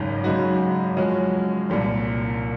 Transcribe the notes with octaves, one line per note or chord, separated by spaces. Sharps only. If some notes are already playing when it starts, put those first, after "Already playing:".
Already playing: G#1 F#2 C#3 G#3 D#4
F#2 C#3 G#3 D#4 F#4
F#2 F3 G#3 C#4 F#4
C2 A#2 F3